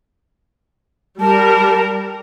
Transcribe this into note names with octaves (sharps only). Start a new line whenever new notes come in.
G3 A#4 A5